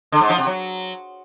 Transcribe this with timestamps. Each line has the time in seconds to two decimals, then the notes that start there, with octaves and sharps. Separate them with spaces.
0.12 D3
0.21 G#2
0.30 F3
0.38 C3
0.47 F#3